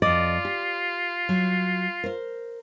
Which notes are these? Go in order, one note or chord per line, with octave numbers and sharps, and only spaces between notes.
F2 F4 D5 D#5
G4
F#3
A#4 C5